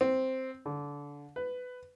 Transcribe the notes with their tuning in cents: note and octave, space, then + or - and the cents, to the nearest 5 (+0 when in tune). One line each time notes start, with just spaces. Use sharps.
C4 +0
D3 -25
B4 +15